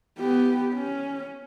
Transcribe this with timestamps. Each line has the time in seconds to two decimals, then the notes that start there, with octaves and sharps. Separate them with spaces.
0.19 B3 G4
0.75 C#4